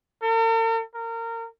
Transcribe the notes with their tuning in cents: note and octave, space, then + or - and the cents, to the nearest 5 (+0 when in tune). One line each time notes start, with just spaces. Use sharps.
A#4 -45
A#4 -25